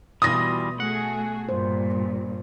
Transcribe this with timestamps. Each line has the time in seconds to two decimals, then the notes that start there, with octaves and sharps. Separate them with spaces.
0.22 B2 E3 G3 F4 D#6 A#6
0.80 A3 F#4 G#4 F#5
1.49 G2 A#2 C5